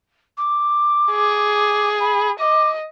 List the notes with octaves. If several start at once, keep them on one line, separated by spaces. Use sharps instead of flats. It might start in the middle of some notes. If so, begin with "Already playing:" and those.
D6
G#4
B5
D#5 D6